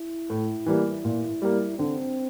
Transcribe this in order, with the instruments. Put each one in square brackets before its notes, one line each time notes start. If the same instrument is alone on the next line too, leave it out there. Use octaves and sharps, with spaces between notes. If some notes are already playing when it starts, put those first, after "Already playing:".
Already playing: [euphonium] E4
[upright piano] A2
E3 G3 A#3
A#2
G3 A#3
[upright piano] D3 [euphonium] C4